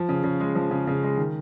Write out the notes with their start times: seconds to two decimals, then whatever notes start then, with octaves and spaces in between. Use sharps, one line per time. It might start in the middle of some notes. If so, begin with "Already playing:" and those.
Already playing: F3
0.09 C#3
0.24 C#3
0.40 G#3
0.55 F3
0.71 C#3
0.87 C#3
1.03 G#3
1.17 D#3